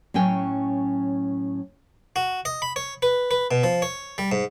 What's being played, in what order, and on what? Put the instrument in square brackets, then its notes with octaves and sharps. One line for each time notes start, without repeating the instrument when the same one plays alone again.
[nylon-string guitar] A2 F#3 C#4 G5 G#5
[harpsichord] F#4
D#5
B5
C#5
B4
B4
B2
F3
C#5
G3
G#2